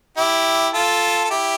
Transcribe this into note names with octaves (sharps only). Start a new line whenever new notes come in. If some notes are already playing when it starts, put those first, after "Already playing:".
E4 G4
F4 A4
A4
E4 G4